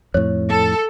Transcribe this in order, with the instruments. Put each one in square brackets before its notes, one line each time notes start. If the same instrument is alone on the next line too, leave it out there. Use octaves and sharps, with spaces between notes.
[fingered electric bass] F2 A2 [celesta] C#5
[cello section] A4